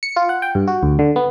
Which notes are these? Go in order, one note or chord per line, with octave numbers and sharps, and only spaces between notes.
C#7
F4
F#5
G5
G2
F#4
D2
D3
B3